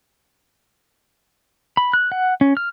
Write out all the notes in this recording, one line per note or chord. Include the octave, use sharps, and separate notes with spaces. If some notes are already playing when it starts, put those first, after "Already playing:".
B5
F#6
F#5
C#4
F6